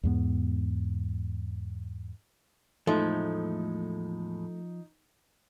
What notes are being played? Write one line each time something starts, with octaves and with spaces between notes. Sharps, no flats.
E2 G#2 B3
E2 A2 F3 G#3 A3 D#4